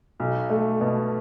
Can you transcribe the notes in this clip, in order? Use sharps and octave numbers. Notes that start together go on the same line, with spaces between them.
B1
A3
B2